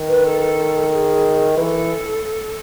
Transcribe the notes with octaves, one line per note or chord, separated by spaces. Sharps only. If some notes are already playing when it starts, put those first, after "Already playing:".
Already playing: D#3
B4
A4
A4
G#4
E3 A4 B4